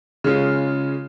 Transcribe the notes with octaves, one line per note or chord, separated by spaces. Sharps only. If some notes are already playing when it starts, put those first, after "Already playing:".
C#3 G#3 C#4 F4